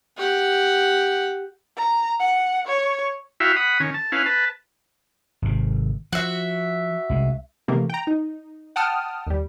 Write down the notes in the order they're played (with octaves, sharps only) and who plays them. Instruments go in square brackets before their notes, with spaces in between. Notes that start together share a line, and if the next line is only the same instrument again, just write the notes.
[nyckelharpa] G4 F#5
[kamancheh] A#5
F#5
C#5
[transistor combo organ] E4 F#4 E5 F5 G5
F#5 B5 D#6
D#3 C#4
A5
C#4 E4 B4 F5
B4 A5
[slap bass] G#1 C3
[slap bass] F3 [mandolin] F#4 E5
[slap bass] C2 G#3
[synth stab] C3 D#3 E3 A3 A#3
G5 A#5
D#4
F#5 G5 A5 D#6 F6
D#2 G3